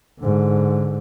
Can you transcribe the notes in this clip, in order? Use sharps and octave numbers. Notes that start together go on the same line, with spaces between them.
G#2 D3